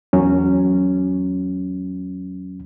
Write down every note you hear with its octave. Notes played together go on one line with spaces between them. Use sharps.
E2 F#3 C#4